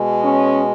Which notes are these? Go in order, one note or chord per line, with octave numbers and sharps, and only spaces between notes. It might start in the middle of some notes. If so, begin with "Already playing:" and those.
Already playing: B2 G#3
C#4